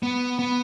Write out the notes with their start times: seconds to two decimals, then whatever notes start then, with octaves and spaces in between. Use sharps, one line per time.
0.03 B3
0.39 B3